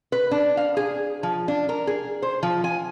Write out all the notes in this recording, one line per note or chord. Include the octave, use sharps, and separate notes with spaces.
B4
D4
F5
G#4
F3
D4
A#4
G#4
C5
F3
G#5